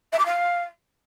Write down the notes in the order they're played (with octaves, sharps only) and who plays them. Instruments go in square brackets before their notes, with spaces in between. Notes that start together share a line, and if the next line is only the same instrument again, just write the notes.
[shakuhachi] E5
D6
F5